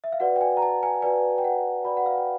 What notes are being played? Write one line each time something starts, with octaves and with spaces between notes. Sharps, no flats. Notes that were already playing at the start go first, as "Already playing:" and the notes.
E5
F5
F#4 B4 D5 F#5
G5
G#5
A#5
A5
G#5
F#4 B4 D5 G#5
G5
F#5
F#4 B4 D5 B5
F#5
F5
G5